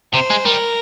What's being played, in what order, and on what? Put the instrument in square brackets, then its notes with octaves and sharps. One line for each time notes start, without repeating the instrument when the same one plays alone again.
[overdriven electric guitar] C3 [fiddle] C5
[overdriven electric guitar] G#3
[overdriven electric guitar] G3 [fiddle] A#4